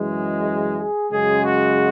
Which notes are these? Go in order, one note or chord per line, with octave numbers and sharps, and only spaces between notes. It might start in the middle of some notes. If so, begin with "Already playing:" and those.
Already playing: F#2 E3 G#3
G#4
F#2 C#3 G#3 G#4
F#4